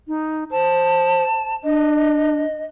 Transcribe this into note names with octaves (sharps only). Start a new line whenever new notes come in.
D#4
C5 A5
D4 D#5